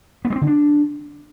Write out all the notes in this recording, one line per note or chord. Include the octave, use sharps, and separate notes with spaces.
B3
G#3
C4
D3
D4